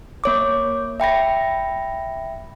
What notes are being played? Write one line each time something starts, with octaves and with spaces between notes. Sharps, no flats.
A#3 C#5 D6
E5 G5 B5 A#6